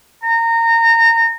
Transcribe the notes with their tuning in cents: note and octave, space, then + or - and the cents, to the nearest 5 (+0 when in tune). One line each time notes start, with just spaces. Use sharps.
A#5 -25